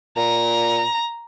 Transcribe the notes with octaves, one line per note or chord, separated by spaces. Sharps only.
A#2 A#5